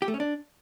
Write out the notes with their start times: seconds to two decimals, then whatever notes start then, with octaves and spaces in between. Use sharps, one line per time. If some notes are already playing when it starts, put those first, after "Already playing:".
0.02 G4
0.08 A3
0.14 C#4
0.20 D4